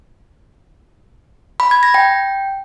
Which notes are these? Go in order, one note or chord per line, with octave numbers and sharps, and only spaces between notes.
B5
G#6
A#6
G5